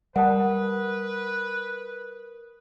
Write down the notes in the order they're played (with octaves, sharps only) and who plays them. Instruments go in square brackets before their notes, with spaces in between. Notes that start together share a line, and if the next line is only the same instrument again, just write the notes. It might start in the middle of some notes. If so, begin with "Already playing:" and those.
[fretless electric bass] G3 [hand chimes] A#4 D#6 [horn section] B4 [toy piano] F#5 A5